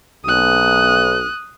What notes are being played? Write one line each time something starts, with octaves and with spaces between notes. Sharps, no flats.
B1 D#6 F#6